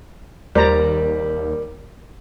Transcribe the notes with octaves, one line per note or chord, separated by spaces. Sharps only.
D#2 G3 A#4 C5 D5 A#5